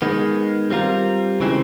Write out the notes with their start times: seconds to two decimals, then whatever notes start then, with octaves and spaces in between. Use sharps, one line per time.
0.02 D#3 G#3 B3
0.71 G3 C4 F4 A#4
1.40 C#3 E3 G#3 C4